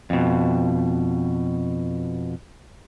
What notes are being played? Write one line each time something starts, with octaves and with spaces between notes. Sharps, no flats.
F2 B2